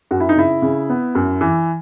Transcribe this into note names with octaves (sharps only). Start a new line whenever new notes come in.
F#2 F#4
E4
D#4
C#3 E4
C#3
B3
F#2
E3